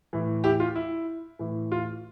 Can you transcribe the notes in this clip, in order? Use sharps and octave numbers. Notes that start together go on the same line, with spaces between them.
A2 E3
E4 G4
F4
E4
A2 E3
F4